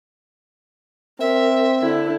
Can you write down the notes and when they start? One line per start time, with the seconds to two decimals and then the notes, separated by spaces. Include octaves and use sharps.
1.20 C4 A#4 E5
1.82 D3 E4